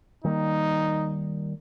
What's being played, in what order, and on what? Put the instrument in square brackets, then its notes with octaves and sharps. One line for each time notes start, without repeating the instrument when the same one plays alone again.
[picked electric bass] D#3 G3 A#3 [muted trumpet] D#4